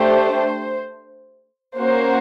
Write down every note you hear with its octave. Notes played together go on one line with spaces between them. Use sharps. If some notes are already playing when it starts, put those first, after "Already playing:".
Already playing: A3 D4 G4 C5
A#3 C#4 F#4 C5